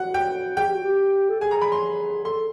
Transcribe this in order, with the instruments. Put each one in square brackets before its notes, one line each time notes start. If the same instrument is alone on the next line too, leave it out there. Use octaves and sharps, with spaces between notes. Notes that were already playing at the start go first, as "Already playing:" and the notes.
Already playing: [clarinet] F#4 [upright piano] F#5
[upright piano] G5
[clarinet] G#4 [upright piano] G5
[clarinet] G4
F#4
G4
A4
[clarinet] G#4 [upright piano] G#5
[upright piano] A#5
B5
C6
[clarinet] A4 [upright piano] C6